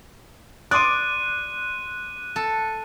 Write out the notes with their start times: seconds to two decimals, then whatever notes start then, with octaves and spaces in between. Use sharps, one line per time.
0.71 D5 C6 D6 D#6 F#6 D#7
2.36 A4